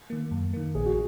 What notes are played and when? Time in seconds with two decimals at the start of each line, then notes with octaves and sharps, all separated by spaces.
0.10 D#3 A#3
0.31 F#2
0.53 D#3 A#3
0.75 A#1 G#4
0.86 F#4